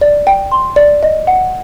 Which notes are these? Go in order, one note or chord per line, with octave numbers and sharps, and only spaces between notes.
D5
G5
C6
D5
D#5
F#5